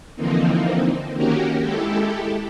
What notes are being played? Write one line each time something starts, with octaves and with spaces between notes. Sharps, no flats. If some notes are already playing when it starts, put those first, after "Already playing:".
D3 E3 F3 A#3 C4 D#4
D#3 A#3 C#4 F#4 G4 A#4
G#3 E4 G4 A4